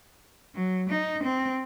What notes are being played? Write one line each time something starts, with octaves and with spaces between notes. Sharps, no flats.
F#3
D#4
C4